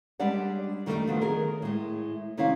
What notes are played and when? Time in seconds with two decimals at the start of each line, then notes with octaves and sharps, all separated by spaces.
0.20 G3 G#3 D4 G4 D5 F#5
0.86 F#2 D#3 G3 A3 B3 D4
1.07 F3 F#3 B3
1.21 D#3 G#4 A#4
1.62 A2 G#3
2.37 C3 D#3 C#4 E4 G4 F5